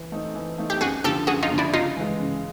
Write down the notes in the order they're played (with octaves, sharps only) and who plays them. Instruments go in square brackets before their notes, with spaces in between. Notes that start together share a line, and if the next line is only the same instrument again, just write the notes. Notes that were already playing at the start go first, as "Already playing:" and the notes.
Already playing: [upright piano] E3
A3 C4 D#4
E3
A3 C4 D#4
[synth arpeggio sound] G4
[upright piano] F#2 [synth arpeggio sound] F#4 G#4
[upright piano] D3 F3 [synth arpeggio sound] G4 A4
[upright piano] F#2 [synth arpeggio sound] F#4 G#4
[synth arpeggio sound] D#4 F4
[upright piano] D3 F3
[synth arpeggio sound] D4 E4
[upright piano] C#3 [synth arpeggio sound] D#4 F4
[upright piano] E3 G#3
C#3